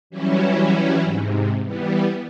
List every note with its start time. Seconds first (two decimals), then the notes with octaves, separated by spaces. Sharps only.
0.10 E3 F#3 G3 C#4 E4
1.03 G#2 C3
1.63 E3 G3 B3